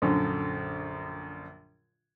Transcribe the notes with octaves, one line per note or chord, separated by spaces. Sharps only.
A#1 F#2 D3